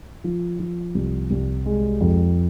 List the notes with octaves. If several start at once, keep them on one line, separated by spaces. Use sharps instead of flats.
F3
F3
C2
C2
G#3
F2